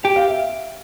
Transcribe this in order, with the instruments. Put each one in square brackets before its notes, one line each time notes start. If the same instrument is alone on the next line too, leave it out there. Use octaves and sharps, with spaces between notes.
[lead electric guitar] G4 [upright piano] G5
[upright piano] F5
E5